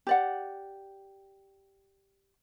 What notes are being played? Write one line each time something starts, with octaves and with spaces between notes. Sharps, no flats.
G4 D5 F#5